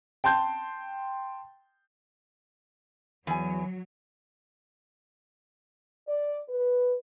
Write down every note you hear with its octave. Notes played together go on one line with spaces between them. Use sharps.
G5 A5 C6 G6
E2 F#3 G#5
D5
B4